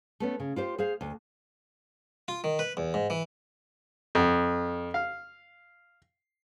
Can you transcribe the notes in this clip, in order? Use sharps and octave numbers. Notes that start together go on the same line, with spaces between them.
A3 B3 C#4
C#3
F4 G4 C5
G#4 C5 F5
D2
F4
D#3
B4
E2
G#2
E3
F2
F5